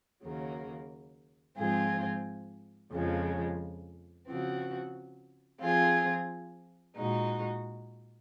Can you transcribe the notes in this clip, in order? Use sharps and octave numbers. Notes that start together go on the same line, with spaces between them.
D#2 C#3 F#3 A#3
G#2 F3 C4 F4 G#4
F2 C#3 F3 G#3
C#3 F3 C4 F#4
F3 C4 F4 G#4
A#2 G#3 D#4 F#4